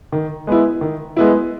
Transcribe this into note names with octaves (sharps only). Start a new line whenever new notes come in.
D#3
G#3 B3 E4
D#3
G#3 B3 E4